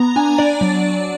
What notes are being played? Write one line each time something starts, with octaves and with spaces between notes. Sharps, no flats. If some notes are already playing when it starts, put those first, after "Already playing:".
Already playing: B3 A#5
D4 G#5
D4 D5
F#3